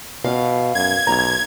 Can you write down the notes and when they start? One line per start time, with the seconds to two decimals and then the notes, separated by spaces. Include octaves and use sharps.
0.25 B2 F5
0.75 F#2 G#6
1.07 B1 A#5